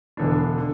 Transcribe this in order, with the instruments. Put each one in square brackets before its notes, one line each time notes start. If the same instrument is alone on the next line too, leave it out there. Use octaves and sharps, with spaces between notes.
[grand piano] E1 E2 D3 B3 D4
D3